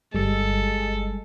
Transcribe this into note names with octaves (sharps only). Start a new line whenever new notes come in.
G1 G3 G#3 A4